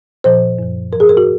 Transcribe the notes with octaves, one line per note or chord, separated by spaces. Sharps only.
A#2 F3 C5
F#2 F3
G#2 F3 G#4 A#4
A#4
F#4